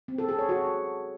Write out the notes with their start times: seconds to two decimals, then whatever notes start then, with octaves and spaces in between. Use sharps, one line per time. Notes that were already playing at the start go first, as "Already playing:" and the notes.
0.08 C4
0.18 A4
0.29 G#4
0.39 C#5
0.49 F#4